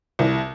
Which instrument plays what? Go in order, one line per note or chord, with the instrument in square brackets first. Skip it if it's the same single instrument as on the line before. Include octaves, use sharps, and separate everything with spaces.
[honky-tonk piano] C2